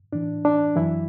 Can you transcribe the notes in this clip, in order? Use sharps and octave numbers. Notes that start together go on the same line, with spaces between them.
A2 E3 D4
D4
F#2 E3 F#3 E4